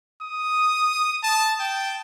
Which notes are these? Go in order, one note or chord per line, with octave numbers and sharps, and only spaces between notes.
D#6
A5
G5